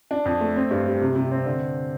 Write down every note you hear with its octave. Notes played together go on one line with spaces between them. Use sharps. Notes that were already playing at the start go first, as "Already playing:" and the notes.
D4
F2
A3
C4
G2
G3
C3
C3
C4
D3